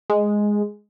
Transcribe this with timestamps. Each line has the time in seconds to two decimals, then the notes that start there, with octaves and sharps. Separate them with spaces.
0.10 G#3